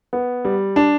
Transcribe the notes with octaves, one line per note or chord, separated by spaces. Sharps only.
B3
G3
D4